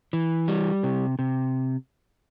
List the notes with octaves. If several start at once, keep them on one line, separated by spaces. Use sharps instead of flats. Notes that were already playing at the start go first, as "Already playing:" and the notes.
E3
G3
C3
C3